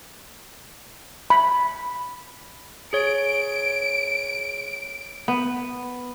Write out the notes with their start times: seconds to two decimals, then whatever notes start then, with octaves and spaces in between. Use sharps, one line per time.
1.30 B5
2.93 G#4 C#5 D7
5.28 B3